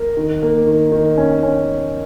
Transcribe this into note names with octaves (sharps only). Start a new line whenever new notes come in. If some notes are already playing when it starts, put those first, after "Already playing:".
Already playing: A#4
D#3
A#3
D#3
D#3
C#4
C#4